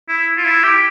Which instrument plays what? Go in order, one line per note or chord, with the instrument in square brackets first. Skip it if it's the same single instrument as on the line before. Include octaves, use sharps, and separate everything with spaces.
[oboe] E4
F4
E4
G4